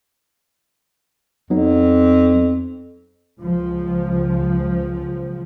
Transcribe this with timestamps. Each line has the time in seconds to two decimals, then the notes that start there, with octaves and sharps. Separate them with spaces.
1.50 F2 F#3 B3 D#4
3.39 C#2 F3